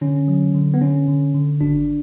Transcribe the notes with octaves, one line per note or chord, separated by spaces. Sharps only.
D3 C#4
F#3
D3
B3
D3 C#4
D3
D3
G#1 D4